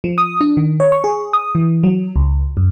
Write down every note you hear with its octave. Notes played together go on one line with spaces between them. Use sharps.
F3
D#6
D4
D#3
C#5
C#6
G#4
D#6
E3
F#3
C#2
F#2